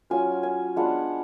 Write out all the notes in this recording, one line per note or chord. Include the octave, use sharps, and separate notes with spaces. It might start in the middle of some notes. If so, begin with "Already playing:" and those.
F#3 C#4 F4 G#5
G#5
G#3 B3 D4 F4 F#5